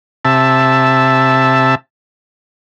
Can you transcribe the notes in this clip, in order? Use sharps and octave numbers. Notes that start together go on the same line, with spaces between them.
C3 E5 A5